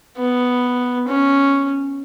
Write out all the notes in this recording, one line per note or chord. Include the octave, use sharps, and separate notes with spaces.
B3
C#4